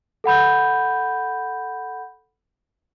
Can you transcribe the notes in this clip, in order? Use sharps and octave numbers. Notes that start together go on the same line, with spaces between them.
A4 F#5 B5 G6